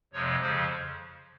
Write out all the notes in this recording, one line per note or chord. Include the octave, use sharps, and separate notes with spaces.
F2 C3 F3 G#3 C#5
F2 C#3 F3 C5